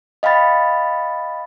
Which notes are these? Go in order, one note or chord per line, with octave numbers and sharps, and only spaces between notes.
D#5 F5 G5 B5 A6